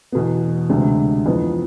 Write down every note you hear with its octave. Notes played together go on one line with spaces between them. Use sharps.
E2 B2 B3
D2 C3 G#3 D4
F2 E3 B3